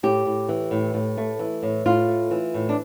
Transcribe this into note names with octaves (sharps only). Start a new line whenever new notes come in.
A2 G4
A2
E3
A2
A2
A3
E3
A2
A2 F4
A3
E3
A2
D4